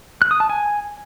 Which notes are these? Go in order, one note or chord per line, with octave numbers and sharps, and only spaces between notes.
F#6
D#6
A5
G#5